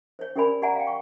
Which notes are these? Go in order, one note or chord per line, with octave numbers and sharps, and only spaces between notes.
C5 C#5
C#4 G4 A#4 D5 G#5 B5
G4 D5 F#5 G#5 A#5
F5 G5
C#6